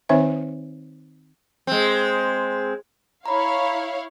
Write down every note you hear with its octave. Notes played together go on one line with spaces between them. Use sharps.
D#3 C4 D#4 C5 C#5 E5
G#3 C4
E4 C#5 F5 A#5 B5